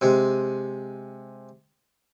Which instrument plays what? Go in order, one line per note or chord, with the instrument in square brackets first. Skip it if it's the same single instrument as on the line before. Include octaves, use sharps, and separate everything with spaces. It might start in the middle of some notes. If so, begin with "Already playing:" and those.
[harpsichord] C3 G#3